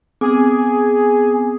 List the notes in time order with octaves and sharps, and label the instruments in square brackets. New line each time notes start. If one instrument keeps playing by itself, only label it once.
[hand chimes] B3 C4 D6 [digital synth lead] G#4